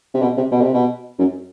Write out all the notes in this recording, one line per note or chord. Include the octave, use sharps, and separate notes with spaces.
C3
B2
C3
B2
C3
B2
F#2